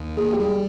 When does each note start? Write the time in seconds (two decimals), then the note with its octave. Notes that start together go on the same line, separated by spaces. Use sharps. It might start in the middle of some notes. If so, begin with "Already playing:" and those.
Already playing: D#2
0.17 A#3 G#4
0.33 G4
0.39 G3 G#4